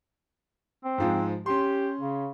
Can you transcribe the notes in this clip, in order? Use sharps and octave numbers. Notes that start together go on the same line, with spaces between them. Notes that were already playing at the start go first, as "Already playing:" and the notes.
C4
G#2 F3 G#3
C#4 G4 C6
C#3